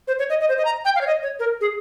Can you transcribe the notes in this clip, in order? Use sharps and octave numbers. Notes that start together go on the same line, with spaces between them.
C5
C#5
D#5
D#5
C5
D#5
A#5
G5
F5
C#5
D#5
C#5
A#4
G#4